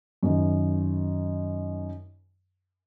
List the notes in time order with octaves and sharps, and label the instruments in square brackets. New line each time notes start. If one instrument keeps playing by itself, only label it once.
[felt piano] F#2 D#3